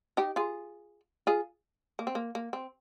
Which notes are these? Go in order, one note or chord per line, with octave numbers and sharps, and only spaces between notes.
D#4 G4
F4 G#4
F4 G#4
A#3
C4
A#3
A#3
C4